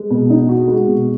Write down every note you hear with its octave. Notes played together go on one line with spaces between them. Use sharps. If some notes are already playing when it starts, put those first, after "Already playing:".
Already playing: G#3
B2
D#4
F#4
G#3
B2